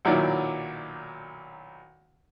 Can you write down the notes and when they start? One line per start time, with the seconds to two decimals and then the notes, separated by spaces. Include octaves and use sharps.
0.05 B1 A#2 D#3 F#3 E4 D5